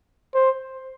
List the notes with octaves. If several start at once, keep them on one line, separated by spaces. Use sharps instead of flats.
C5